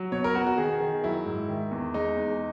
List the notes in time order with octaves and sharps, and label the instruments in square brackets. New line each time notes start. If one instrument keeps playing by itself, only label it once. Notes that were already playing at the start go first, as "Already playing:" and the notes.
Already playing: [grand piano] F#3
B2 C#5
A#4
B3 F#4
F#4
D#3 G#4
D#3
F#3 E4
G#2
D#3
E2
G#3 D#4
E2